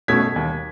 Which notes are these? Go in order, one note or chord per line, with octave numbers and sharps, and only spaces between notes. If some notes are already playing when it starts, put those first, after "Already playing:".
B2 A3 C#4 G#6 B6
D#2